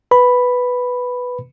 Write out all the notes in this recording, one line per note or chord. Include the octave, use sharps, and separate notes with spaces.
B4 B5